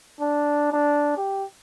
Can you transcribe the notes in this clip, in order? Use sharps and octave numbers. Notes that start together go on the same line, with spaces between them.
D4
D4
G4